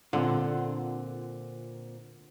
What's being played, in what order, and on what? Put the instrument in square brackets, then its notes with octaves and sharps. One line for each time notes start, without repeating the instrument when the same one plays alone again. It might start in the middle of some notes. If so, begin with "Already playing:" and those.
[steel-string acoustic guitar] A#2 C4 F#5 [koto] D3 [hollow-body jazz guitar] F4